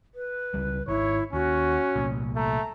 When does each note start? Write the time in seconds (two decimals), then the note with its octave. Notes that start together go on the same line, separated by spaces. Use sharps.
0.15 B4
0.54 C#2 G3
0.88 G#1 E4 C#5
1.33 D#2 C#4 F#4
1.96 C2 A#2
2.36 A3 A#5